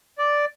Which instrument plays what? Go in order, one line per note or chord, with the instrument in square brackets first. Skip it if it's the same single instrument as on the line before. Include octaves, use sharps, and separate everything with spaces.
[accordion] D5